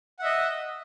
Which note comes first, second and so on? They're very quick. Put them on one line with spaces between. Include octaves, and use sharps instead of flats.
F#5 E5 D#5